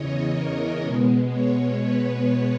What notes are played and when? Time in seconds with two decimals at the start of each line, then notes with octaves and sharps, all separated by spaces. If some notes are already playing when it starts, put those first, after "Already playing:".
Already playing: E2 C#3 E3 C#5 D#5
0.32 A#4
0.82 B2 G#3 B3
1.31 C#5
1.82 B4